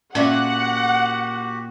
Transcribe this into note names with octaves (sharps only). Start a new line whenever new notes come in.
A#2 A#3 C#4 F#4 G4 D5 E5 F#5